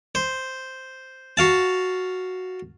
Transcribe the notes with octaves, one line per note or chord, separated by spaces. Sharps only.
C5
F#4 F5 A5